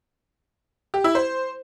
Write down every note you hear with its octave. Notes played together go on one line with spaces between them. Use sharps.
G4
E4
C5